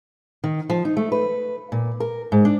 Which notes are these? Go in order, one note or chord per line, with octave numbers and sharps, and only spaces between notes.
D#3
F3
D#4
A3
B4
A#2
A#4
G#2
D4